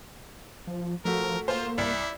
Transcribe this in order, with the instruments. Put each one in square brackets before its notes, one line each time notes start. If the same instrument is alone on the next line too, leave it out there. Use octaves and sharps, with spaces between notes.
[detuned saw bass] F3
[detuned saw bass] F3 [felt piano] A3 F#4 [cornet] A#4
[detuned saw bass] A#3 [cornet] F4 [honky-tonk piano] C5
[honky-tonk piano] C2 [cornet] E4 [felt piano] D5